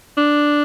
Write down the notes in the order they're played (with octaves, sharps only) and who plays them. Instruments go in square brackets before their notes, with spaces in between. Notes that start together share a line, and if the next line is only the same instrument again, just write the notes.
[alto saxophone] D4